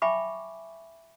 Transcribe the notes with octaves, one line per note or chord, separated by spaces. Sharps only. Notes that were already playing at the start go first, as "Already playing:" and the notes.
E5 G5 G#5 B5 C#6 D6